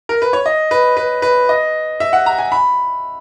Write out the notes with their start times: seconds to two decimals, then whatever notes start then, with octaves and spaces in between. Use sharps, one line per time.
0.09 A#4
0.22 B4
0.33 C#5
0.46 D#5
0.71 B4
0.97 B4
1.22 B4
1.49 D#5
2.00 E5
2.13 F#5
2.26 A#5
2.38 G#5
2.52 B5